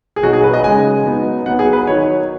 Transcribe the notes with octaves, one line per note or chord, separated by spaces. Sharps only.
G#4
B2 F#3 D#4 F#4
G#4
B4
D#5
C#3 G#3 D#4 G#5
F#3 B3 D#4
F#3 B3 D#4 F#5
G#4
B4
D#3 F#3 D#4 C#5